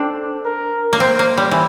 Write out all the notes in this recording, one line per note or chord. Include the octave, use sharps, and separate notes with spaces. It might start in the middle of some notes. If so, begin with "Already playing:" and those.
Already playing: C4 D4 A4
A#4
A#3
C4 C5
A#3
G3
E3